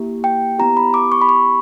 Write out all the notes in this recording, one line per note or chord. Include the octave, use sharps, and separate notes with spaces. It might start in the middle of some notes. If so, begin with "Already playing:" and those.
Already playing: A#3 E4 G4
G5
B3 E4 G4 A#5
B5
D6
C#6
B5
C#6